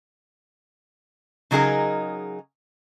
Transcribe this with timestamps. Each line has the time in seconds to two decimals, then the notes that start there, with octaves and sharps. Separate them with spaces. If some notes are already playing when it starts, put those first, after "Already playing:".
1.51 C#3 F#3 D#4 G#4 A#4 D#5